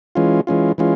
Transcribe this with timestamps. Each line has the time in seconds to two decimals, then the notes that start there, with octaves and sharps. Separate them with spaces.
0.15 E3 G#3 C#4 F4
0.47 E3 G#3 C#4 F4
0.78 E3 G#3 C#4 F4